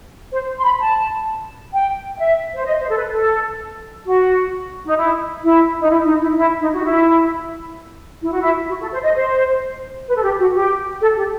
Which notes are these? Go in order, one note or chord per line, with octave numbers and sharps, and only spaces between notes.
C5
C6
B5
A5
G5
E5
C5
D#5
C5
A4
B4
A4
F#4
D#4
E4
E4
D#4
E4
D#4
E4
E4
D#4
F#4
E4
E4
F#4
E4
F#4
A4
C5
D#5
C5
B4
A4
G4
F#4
G4
A4
G4